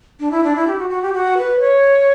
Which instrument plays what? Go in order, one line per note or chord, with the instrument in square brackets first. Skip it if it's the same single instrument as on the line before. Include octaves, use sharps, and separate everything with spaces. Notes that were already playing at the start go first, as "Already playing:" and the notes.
[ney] D4
E4
D4
E4
G4
F#4
F#4
G4
F#4
B4
C#5